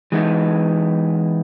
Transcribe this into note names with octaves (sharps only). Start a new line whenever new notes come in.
E3 G#3 B3 D#4